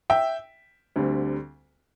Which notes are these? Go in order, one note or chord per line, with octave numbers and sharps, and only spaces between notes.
E5 G5
D2 D3 G3 C4